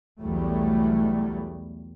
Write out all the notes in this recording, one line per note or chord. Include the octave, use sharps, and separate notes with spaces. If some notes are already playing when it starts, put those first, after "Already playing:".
B1 E2 F#3 G3 A3